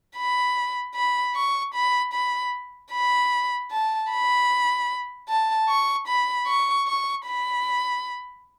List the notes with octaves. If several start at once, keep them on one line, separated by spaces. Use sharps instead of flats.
B5
B5
C#6
B5
B5
B5
A5
B5
A5
C#6
B5
C#6
C#6
B5